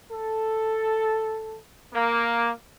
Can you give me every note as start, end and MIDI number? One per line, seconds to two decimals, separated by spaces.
0.12 1.58 69
1.93 2.50 58